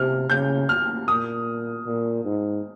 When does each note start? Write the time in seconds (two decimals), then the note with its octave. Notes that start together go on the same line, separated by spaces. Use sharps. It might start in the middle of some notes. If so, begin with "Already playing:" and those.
Already playing: C3 F6
0.30 C#3 G6
0.69 F6
1.08 A#2 D#6
1.86 A#2
2.24 G#2